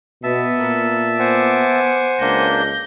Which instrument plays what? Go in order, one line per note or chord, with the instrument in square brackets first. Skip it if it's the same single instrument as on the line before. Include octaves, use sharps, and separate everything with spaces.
[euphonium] B2 [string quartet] B3 [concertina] E5 A5
[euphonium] A#2 [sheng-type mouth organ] A#3
[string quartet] B3 D6 [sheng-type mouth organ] C5 F#5 G#5
[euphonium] C#2 [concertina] A#3 D4 [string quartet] G6 A#6